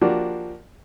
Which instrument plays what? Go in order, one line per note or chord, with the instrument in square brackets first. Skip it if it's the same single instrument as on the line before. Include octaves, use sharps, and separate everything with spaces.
[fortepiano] F3 A#3 D4 F#4 G4